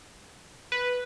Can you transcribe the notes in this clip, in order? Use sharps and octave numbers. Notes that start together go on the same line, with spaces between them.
B4